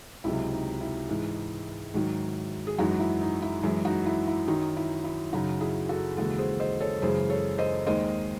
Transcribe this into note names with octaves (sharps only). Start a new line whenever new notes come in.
C#2 C3 F#3 E4
D#4
E4
G#2 E3 G#3
G#2 D#3 F#3
G#4
F#2 E3 G#3 D#4 F#4
E4
D#4
E4
F#2 E3 G#3 E4
D#4 F#4
E4
E4
F#2 D#3 F#3 D#4
E4
E4
F#2 C#3 F#3 D#4 F#4
E4 G#4
F#4 A4
D#2 C#3 E3 G#3 F#4 A4
G#4 C5
C5 D#5
A4 C#5
F#2 C#3 E3 G#3 G#4 C5
A4 C#5
C5 D#5
D#2 D#3 G#3 C5 D#5